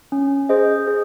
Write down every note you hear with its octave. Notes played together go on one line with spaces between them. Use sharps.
C#4
G#4 C5 D#5
G#4